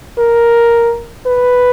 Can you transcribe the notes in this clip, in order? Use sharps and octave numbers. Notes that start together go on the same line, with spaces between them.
A#4
B4